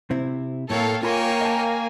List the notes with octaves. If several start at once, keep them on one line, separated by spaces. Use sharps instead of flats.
C3 C4 E4
A2 A3 A#3 A4 C#5 F5 G5
A#3 F4 C#5 G5 G#5 B5 C6
D#5 A5